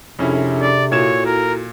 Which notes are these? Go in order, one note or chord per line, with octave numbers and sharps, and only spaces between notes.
F2 C3 C#4 D4 E4 G#4 A4
D5
A#2 E4 F#4 A4 C#5 G#6 E7
A#4